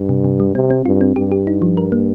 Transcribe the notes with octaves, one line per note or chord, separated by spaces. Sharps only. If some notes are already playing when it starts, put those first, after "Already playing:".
Already playing: G2
C3
C3
G3
C3 C4
C4
G2 F4
C4
G2 G4
G4
D#4
F3
A#4
A#3